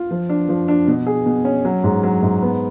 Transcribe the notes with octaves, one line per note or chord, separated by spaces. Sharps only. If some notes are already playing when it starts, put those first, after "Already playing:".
Already playing: F4
F3
D4
F3
D4
B2
G#4
B2
C#4
F#3
G#2
F#3
G#2
B3